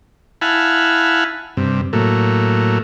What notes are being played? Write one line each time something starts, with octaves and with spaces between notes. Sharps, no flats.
E4 F5 F#5 G#5 A5 B5
G2 C3
A2 F#3 A3 A#3